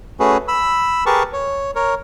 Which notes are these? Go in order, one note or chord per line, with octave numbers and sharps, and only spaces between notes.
A3 C#4 F#4 G#4 B4
B5 E6
G4 G#4 A#4 B4 A5 C#6
C#5
A#4 C#5